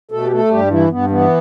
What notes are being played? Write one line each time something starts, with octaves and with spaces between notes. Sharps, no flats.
B2 A3 A4
G4
A3 A4
G2 G3 G4
E3 E4
G2 B3
E3 B3